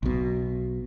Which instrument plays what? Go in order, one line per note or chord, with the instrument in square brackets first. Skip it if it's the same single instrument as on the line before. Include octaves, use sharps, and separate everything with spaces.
[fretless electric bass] B1 B2